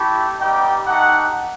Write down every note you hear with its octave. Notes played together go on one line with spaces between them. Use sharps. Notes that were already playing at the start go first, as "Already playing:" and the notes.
Already playing: A3 E4 G4
G3 B3 D#4 G4 G5
A3 D#4 G4 F#5